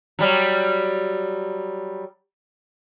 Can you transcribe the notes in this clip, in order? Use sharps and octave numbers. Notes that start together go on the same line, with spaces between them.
F#3 G3